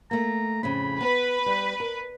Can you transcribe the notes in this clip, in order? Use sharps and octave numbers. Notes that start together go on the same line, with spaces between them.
A3 A#3 A#5
F2 A2 C#3 B5
B3 B4
G3
A#4